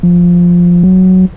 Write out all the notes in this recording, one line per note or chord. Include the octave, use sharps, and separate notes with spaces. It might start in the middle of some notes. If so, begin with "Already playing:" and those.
F3
F#3